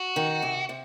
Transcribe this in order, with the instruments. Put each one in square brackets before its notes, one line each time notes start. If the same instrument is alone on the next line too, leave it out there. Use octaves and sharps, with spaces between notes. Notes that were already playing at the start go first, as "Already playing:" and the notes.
Already playing: [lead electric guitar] F#4
[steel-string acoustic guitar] D#3
C3
C3